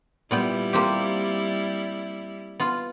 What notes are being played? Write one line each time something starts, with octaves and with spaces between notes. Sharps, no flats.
A#2 G3 B3 E4 G5
A#3 C4 G4
B3 F4